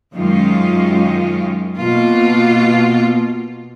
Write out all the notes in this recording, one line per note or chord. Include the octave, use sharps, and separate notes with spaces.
F#2 D#3 G#3 C#4 F4
B2 A#3 F4